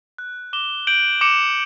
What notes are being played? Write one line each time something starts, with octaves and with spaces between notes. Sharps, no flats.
F#6
D6 E7 G7
G6 D7 F#7
D6 C#7 E7